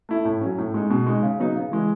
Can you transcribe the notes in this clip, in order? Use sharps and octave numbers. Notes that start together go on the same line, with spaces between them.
A3 E4
A2
F#3 C#4
A2
G#3 D#4
B2
G#3 D#4
C#3
F#3 B3 D#4
C#3
E3 G#3